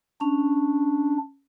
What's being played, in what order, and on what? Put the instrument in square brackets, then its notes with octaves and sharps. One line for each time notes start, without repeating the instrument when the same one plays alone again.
[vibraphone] C#4 [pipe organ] D4